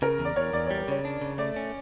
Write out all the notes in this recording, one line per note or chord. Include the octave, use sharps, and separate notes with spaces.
C#3 A#4
E2
D5
E2 C#5
E2 D5
G3 C#5
A#4
C#3 C#5
D4
C#3
A3 D5
C#4